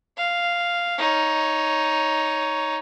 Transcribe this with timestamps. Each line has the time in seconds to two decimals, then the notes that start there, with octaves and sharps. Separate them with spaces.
0.17 F5
0.99 D#4 C#5